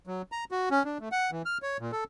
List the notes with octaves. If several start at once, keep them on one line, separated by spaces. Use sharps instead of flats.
F#3
A#5
F#4
C#4
D4
A3
F#5
E3
F6
C#5
A#2
A4